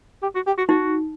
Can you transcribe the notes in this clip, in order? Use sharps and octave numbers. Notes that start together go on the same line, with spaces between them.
G4
F#4
G4
F#4
D#4 F#4